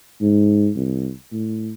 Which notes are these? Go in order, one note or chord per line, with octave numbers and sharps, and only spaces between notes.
G#2
C2
A2